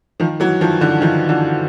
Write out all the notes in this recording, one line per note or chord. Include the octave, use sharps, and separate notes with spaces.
D#3 F3
E3 F#3
D#3 F3
D3 E3
D#3 F3
D3 E3